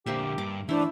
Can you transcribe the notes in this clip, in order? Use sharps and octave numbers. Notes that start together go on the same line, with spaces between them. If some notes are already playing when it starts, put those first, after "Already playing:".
A#2 D3 A#3 G4 C5 E5
G2 D6
E3 A3 D4 E4 C5